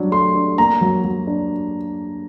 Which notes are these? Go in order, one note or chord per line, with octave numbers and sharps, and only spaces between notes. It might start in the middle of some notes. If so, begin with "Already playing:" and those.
Already playing: F#3 G3 D4
A3 C6
D4
A#3 A#5
F#3
F#3
D4